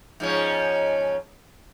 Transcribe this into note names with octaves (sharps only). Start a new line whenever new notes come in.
G#2 F3 C#4